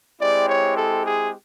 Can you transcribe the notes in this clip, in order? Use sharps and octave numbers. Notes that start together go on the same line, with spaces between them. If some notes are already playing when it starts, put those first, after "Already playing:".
G#3 C4 E4 G4 D5
C#5
A4
G#4